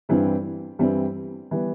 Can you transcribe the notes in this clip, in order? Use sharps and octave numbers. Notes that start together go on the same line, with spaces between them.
G2 E3 G3 C4 E4
G2 E3 G3 C4 E4
E3 G3 B3